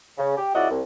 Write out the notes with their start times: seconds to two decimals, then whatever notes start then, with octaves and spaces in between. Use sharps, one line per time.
0.18 C#3
0.37 G4
0.55 C#2 E4 F#4 D5 D#5
0.70 C2